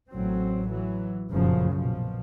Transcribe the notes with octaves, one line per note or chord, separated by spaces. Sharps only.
A1 F#3 C4
E3 F#3
F1 F#2 A#2 C#3 F3
A#1 B2 F3